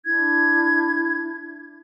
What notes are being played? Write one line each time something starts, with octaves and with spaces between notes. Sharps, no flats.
D4 E4 G#6